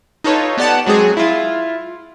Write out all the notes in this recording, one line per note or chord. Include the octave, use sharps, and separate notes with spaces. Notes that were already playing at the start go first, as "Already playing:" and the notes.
D#4 F4 A4 B4 C#5
B3 G4 D5 F#5 A5
F#3 G#3 C4 G#4
E4 F4